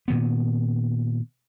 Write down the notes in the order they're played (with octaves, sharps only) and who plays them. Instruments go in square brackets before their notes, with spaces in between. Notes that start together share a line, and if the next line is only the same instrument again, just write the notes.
[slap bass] A#2 D#3 B3